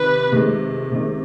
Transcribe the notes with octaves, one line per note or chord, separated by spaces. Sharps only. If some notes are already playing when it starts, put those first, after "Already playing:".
Already playing: C3 D#3 B4
C3 D#3 G#3
C3 D#3 G#3